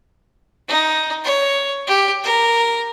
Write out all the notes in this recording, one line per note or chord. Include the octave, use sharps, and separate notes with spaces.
D#4
C#5
G4
A#4